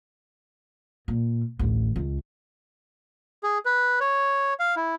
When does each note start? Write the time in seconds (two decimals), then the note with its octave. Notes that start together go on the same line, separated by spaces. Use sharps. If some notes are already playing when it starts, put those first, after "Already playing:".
1.08 A#2
1.59 A1 D2
1.96 C#2
3.43 G#4
3.65 B4
4.00 C#5
4.59 F5
4.76 E4